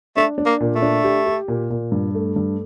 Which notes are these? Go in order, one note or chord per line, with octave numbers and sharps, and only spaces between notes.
A3 D4
D4
A#3
A#2
A3
D4
G4
G4
A#2
A#2
G2
A3
G2